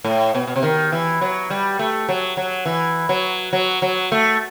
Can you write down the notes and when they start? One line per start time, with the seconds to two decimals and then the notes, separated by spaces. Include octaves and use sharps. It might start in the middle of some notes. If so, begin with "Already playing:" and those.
0.04 A2
0.35 B2
0.47 B2
0.56 C3
0.63 D#3
0.92 E3
1.21 F#3
1.50 G3
1.79 A3
2.09 F#3
2.37 F#3
2.66 E3
3.09 F#3
3.53 F#3
3.82 F#3
4.12 A3